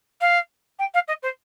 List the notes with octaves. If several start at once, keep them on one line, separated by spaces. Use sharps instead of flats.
F5
G5
F5
D#5
C5